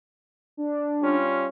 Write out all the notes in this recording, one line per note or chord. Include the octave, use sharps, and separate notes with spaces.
D4
G3 C#4 F4